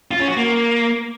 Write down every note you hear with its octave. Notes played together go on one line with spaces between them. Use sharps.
F4
C#4
F#4
A#3